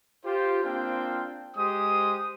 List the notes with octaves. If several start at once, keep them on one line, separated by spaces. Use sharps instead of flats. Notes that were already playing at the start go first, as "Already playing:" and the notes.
F4 G4 C5
A#3 C4 D4 F4 F5 G5
G#3 G4 C5 D#6